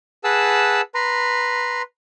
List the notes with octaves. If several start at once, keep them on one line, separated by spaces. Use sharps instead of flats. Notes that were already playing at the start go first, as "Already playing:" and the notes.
G#4 B4 F#5 A5 E6
B4 A#5 C6